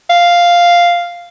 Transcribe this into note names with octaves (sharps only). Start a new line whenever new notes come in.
F5